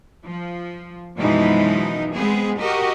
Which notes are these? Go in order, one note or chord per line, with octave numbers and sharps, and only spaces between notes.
F3
F#2 B2 E3 F3 G#3 D#4
G#3 B3 C4 G#4
F#4 G4 A#4 D#5